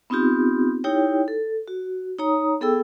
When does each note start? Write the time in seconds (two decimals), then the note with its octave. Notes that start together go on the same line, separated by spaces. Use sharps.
0.10 B3 C4 D#4 F4 G4
0.84 D#4 E4 G4 C#5 G5
1.28 A4
1.68 F#4
2.18 D#4 C#5 A#5 D#6
2.61 B3 G#4 A4 G5 E6